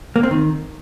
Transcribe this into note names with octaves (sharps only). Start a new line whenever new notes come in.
A#3
C4
D#3